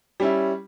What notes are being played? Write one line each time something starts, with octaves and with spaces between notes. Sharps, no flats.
G3 C#4 E4